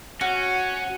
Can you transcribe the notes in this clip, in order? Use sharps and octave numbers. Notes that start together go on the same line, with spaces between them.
C#4 F#4